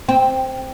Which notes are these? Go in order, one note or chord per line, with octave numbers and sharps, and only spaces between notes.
C4